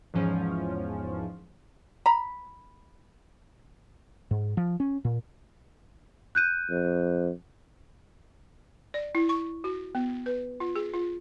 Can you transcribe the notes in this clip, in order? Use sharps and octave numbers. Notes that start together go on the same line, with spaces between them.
E2 G#2 F3 C#4
A#5 B5
G#2
F3
C#4
A#2
F#6 G6 D#7
F2
D5
E4
C#6
F#4
B3
B4
F4
G#4
F4